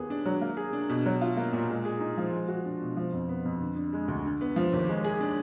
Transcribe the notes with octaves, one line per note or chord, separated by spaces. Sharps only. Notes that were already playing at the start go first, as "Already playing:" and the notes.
Already playing: D#2 B3 G#4
D4
F#3
A#3
G#4
D4
B2
F#3
F4
A#3
A#2
G#3
G#4
D#4
F3
G#3
F#4
D4
B2
F3
F2
B3
F2
D3
D4
G#3
D2
D3
B3
F3
D#2
G#3
G#4
D4